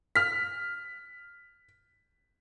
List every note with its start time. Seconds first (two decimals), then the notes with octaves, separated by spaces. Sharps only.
0.15 F6 B6